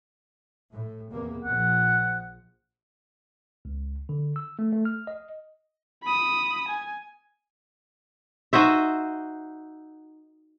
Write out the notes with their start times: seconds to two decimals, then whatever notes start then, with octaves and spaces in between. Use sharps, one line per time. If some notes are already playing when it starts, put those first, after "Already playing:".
0.70 A2
1.10 E2 C3 A#3
1.45 A#1 F3 F#5
3.65 C#2
4.09 D3
4.36 E6
4.59 A3
4.72 A3
4.85 F6
5.07 D#5
6.04 B5 D#6
6.68 G#5
8.53 D#4 F#4 C5 E5